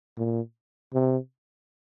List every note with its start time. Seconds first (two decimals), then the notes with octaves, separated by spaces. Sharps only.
0.17 A#2
0.94 C3